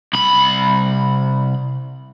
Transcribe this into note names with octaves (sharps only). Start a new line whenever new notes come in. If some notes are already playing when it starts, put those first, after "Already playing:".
C2 B5